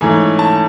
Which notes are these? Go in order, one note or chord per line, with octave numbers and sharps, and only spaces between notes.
G#2 E3 A3 C#4 G#5
A5